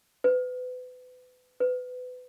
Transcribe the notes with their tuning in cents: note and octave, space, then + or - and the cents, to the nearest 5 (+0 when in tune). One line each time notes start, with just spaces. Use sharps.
B4 +30
B4 +25